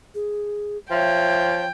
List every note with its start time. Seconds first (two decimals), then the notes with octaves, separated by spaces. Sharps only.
0.15 G#4
0.91 F3 C#5 E5 G5